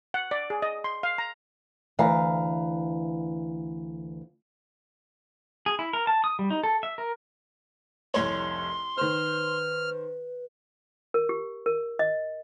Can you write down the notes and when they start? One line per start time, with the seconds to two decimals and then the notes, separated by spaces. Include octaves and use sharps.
0.14 F#5
0.31 D5
0.50 G#4
0.62 D#5
0.84 C6
1.03 F5
1.18 A#5
1.99 D2 E3 F5 A#5
5.66 G#4
5.79 E4
5.93 A#4
6.07 A5
6.24 D#6
6.39 G3
6.50 D#4
6.63 A4
6.83 E5
6.98 A#4
8.14 F1 C2 C#5 C6
8.98 D#3 B4 C5 F6
11.14 A#4
11.29 G4
11.66 A#4
11.99 D#5